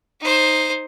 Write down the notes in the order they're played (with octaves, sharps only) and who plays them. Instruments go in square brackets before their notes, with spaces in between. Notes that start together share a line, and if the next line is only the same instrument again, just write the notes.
[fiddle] D#4 C5